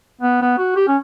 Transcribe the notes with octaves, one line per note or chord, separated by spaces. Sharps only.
B3
B3
F#4
G4
C#4